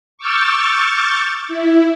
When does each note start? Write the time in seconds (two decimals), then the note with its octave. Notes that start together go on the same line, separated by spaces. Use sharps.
0.18 C#6 D6 E6 F6 G6 A6
1.48 E4